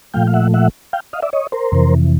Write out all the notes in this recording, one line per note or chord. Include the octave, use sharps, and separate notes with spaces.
A#2 F3 A3 F5 G5
F5
E5 F#5
E5 F#5
F5 G5
D#5 F5
D5 E5
C#5 D#5
A#4 C5
F2 C3 E3